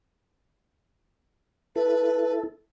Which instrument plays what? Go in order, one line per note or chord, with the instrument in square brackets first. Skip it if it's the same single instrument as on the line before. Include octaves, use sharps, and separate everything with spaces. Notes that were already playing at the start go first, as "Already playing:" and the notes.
[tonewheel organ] E4 A4 [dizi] B4